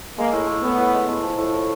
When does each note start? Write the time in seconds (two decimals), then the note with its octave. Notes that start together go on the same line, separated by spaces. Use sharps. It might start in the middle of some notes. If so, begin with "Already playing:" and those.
0.18 G#3 A#3
0.33 A2
0.47 A2
0.63 A2 B3
0.78 A2
0.93 G#3
1.09 A2
1.23 F3
1.38 A2
1.53 A2